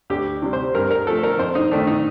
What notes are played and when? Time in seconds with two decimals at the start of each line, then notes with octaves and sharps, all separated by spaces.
0.10 D2 G4
0.42 C3 G3
0.53 C5
0.75 G2 A#4
0.91 A#4
1.06 F3 A3 A4
1.23 A#4
1.39 F2 C5
1.55 D#4
1.71 D#3 A3 D4
1.87 D#4